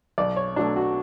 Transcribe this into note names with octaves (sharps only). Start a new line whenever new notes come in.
B1 D5
C#5
B2 F#3 A3 D4
F#4